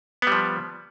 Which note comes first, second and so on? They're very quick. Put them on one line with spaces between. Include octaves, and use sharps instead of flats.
B3 G3 F3